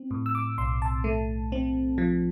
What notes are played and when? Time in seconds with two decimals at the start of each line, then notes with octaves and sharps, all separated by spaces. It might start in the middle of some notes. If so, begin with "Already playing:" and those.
Already playing: C4
0.11 A2
0.26 E6
0.35 D6
0.58 B1 C6
0.82 A5
1.04 A3
1.52 C4
1.98 F3